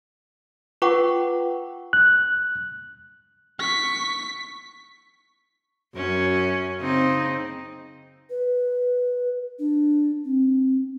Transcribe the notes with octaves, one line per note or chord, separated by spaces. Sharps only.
F4 B4 F#5 G5 C#6 D6
F#6
C#6 B6
F#2 C#4
C#3 C4 D#4
B4
D4
C4